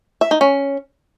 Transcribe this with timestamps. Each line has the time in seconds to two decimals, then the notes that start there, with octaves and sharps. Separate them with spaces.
0.21 E5
0.31 D#4
0.41 C#4